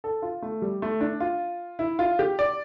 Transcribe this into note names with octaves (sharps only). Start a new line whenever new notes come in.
A4
F4
A3
G3
A3
D4
F4
E4
F4
G4
D5